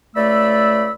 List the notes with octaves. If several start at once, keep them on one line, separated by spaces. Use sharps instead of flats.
C#2 A3 D5 B5 E6